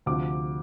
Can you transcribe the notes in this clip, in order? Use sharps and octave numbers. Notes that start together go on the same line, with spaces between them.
D2 C3 F3 D6